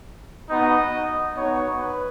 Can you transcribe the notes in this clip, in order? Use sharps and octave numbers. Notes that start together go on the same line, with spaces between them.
B3 D#4 F#4 D#5
B3 D#4 F#4 C#5
B4